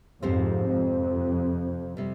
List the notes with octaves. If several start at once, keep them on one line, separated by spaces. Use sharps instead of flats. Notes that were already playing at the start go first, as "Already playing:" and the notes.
F2 G#2 C3 F3 C4 G4 C5
F2
C3 G3